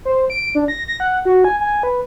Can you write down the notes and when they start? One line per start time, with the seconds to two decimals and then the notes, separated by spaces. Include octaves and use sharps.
0.05 C5
0.30 D7
0.55 D4
0.68 A#6
0.88 A#6
1.00 F#5
1.25 F#4
1.44 G#5
1.61 G#5
1.83 B4